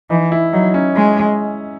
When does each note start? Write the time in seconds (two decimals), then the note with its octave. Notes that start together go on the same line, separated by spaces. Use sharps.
0.10 E3 D#4
0.32 E4
0.53 F#3 D#4
0.74 C#4
0.96 G#3